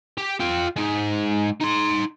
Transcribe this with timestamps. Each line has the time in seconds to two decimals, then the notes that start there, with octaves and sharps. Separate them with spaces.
0.17 G4
0.40 F4 G5
0.77 G#3 D#4
1.60 D#4 C6